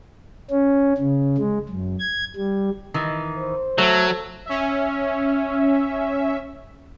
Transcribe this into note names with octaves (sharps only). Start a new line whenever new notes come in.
C#4
C#3
G#3
F#2
G#6
G3
D#3 E3
C5
F#3 A3
C#4 E5